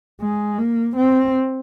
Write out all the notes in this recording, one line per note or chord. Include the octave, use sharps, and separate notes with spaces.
G#3
A#3
C4